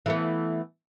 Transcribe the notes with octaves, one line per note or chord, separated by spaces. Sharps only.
E3 A3 B3